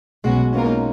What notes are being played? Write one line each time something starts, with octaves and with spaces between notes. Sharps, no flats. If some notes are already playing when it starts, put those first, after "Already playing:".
B1 B2 F#3 G#3 C#4 F#4
B2 A#3 C#4 F4 A#4
D#4